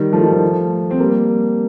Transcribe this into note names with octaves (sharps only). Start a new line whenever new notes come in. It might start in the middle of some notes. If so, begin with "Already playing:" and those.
Already playing: D#3 G3
F3 A3
D#3 G3
F3 A3
C4
G3 A#3